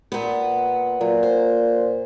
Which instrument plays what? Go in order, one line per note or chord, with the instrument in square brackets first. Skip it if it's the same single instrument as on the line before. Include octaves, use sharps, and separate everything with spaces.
[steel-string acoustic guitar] A#2 B3
[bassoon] A#2 [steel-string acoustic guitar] F#3
[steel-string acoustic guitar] C5